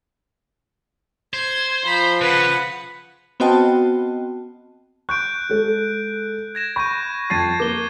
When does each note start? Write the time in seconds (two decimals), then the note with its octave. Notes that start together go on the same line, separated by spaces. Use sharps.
1.34 C5 G#6
1.86 F3 A#5 B5
2.21 C#3 B4 F#5 B6
3.40 B3 C4 F#4 D#5 G5 A5
5.09 C#6 F#6 G6 D7
5.49 G#3 A4
6.55 G#6 A#6 E7
6.76 B5 C#6 G6 D#7
7.30 F2 A5 G#6 A6 C7 D#7
7.60 A#3 A#4 D6 G7